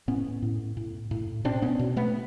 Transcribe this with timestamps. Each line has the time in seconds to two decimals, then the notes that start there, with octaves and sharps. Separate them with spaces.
0.08 A2 B3 C#4
0.42 A2
0.77 A2
1.11 A2
1.44 B2 C4 D4
1.62 B3 C#4
1.79 B2
1.96 A3 B3